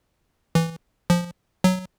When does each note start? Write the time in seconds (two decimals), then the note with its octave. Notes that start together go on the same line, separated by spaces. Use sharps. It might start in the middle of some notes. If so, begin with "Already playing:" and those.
0.55 E3
1.10 F3
1.64 F#3